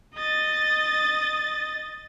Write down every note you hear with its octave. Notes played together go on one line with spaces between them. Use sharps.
D#5 A6